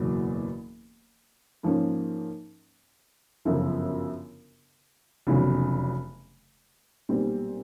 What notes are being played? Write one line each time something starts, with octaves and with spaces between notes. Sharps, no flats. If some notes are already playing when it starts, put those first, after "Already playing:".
Already playing: F#1 E2 B2 F#3
G#2 F3 A#3 C#4
G1 F#2 C#3 F3
F1 E2 C#3 F#3
B1 A#2 G3 C4